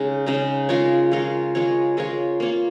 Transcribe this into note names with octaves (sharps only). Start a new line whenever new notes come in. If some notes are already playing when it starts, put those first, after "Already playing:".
Already playing: C#3 G#3 D#4
C#3 G#3 D#4
G#3 F4 A#4 C#5
G#3 F4 A#4 C#5
G#3 F4 A#4 C#5
G#3 F4 A#4 C#5
A#3 F4 C#5